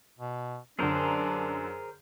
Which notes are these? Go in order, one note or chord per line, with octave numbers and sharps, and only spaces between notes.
B2
F#2 D3 D4 G#4 A#4 C5